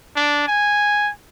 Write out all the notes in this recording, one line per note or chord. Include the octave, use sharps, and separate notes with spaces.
D4
G#5